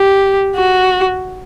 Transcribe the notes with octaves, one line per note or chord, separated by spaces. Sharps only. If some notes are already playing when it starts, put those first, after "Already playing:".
Already playing: G4
F#4